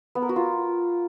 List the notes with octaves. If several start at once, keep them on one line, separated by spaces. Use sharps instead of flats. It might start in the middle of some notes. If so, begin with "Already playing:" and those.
B3
A#4
F#4
F4